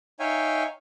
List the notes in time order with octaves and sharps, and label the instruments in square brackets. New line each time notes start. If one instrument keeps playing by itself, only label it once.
[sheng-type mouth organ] D#4 C#5 E5 F5 G5 G#5